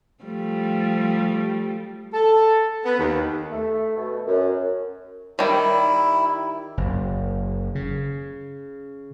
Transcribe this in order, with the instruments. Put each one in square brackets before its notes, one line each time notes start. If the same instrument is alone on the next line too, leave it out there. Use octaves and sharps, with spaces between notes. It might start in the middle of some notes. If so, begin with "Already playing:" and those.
[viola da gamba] F3 G3 A3
[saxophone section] A4
B3
D#2
[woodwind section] A3
B2
F#2
[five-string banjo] D#3 G3 [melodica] E4
[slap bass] F#1
C#3